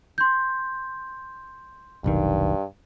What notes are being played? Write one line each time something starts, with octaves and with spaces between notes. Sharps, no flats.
C6 G6
F1 B1 G2 D#3